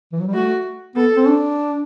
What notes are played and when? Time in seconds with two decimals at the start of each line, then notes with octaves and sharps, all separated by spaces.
0.13 E3
0.20 F#3
0.27 G3
0.34 A3 F#4
0.96 B3 A4
1.16 C4
1.28 D4